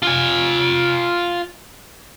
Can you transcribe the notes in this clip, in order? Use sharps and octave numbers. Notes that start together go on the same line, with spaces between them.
F4 G#5